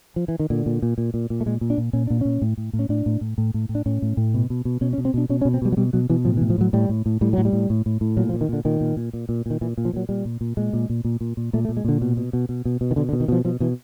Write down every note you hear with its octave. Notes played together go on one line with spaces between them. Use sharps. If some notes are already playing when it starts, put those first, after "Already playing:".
F3
E3
D#3
A#2 D3
A#2
A#2
A#2
A#2
A#2
A3
A#2 G#3
A#2
D4
A#2
A#2 C#4
A#2 D4
A#2 C#4
A2
A2
A2
C#4
A2 D4
A2
A2
A2
A2
A2
D4
A2 C#4
A2
A2
B2
B2
B2
B2 C#4
C#4
B2
C4
B2 D4
B2 C#4
C#4
B2
C4
B2 G3
F#3
B2 G3
B2 F#3
B2 E3
A2 F3
E3
A2
F3
A2 F#3
A2 G3
A2
A2
A2 G3
A2 F#3
G3
A2
A2
A2
A2
A#2 F#3
F3
A#2
D#3
A#2 D3
A#2 D#3
A#2
A#2
A#2
A#2
A#2 D#3
A#2 E3
A#2
F3
A#2 F#3
A#2 G3
A#2
A#2
A#2 G#3
A#2
A#2
A#2
A#2
A#2
A#2 A3
A3
A#2
G#3
A#2 D3
B2
B2
B2
B2
B2
B2
D#3
B2 D3
D3
B2
D#3
B2 F3
B2 F3
B2 E3